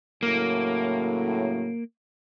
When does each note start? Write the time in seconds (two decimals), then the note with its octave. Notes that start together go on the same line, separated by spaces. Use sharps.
0.23 A2 C#3 F#3 A#3